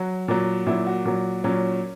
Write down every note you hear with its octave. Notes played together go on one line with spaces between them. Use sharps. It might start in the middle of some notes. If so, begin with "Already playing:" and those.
Already playing: F#3 F#4
A#2 F#3
A#2 F#3 E4
F#4
A#2 F#3
A#2 F#3 C#4